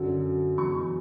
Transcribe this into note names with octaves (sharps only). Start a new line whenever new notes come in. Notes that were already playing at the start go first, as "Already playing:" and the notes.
Already playing: F#2 D3 F#3
E2 B2 F#3 C#6